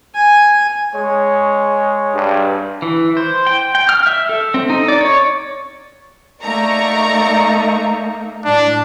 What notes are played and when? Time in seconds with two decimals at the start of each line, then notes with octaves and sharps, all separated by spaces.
0.15 G#5
0.95 G#3 C#5
2.14 G2
2.82 E3
3.17 C5
3.47 G5
3.75 G5
3.89 F6
4.07 E5
4.29 A4
4.54 C4
4.70 D#4
4.88 D5
5.01 C#5
6.43 A3 A#3 D#4 D5 A#5 C#6
8.45 A2 D4